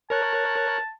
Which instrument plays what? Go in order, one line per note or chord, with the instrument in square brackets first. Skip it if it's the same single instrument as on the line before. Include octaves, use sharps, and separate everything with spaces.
[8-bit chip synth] A#4 C#5 F#6 [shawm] A5